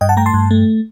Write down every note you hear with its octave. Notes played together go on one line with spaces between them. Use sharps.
G2 D#5 G5
F#5 A5
A3 G5 A#5
A5 C6
G2
A3